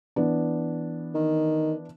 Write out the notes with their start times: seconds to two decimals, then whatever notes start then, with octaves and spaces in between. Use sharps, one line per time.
0.16 E3 B3 D4
1.14 D#3